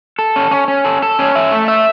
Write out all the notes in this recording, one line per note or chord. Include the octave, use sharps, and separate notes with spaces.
A4
C#4
C#4
C#4
A4
A4
C#4
E5
A3
E5